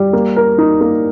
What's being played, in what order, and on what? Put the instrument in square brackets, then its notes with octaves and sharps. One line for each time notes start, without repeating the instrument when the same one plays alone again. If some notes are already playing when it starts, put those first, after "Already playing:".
Already playing: [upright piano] G3
A#3
A#4
D#4
A#3